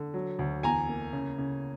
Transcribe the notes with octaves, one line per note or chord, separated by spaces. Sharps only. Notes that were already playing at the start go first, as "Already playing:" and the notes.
Already playing: D3
F#3
D2
E2 G#5 A#5
A#3
C#3
C#3